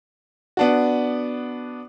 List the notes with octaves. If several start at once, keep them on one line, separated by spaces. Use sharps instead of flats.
B3 D4 F#4